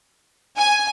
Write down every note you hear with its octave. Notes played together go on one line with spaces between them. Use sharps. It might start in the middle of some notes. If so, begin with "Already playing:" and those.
G#5